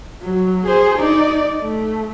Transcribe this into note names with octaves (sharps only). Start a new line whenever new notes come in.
F#3
G#4 C5
D#4 D5
A3